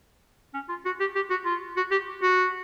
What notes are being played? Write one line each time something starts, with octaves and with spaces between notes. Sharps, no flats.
C#4
F4
F#4
G4
G4
F#4
F4
F#4
G4
F#4